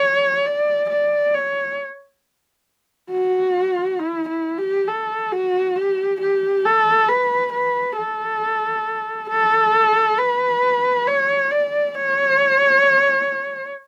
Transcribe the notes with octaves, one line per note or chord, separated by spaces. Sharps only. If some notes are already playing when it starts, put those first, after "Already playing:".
Already playing: C#5
D5
D5
C#5
F#4
E4
E4
G4
A4
F#4
G4
G4
A4
B4
B4
A4
A4
B4
C#5
D5
C#5